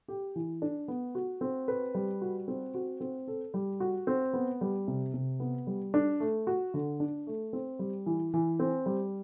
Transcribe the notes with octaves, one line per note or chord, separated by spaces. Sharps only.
G4
E3
D4
B3
F#4
C4
B4
G3
F#4
C4
F#4
C4
A4
G3
F#4
C4
B3
G3
C3
C3
B3
G3
D4
A3
F#4
D3
D4
A3
C4
G3
E3
E3
C4
G3